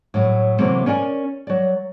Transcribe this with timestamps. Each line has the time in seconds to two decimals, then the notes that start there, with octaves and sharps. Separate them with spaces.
0.14 A2 F#3
0.59 C3 E3 F#3 A3 A#3 C4
0.86 C#4 A#4 D5 F#5 G#5
1.47 F#3 D5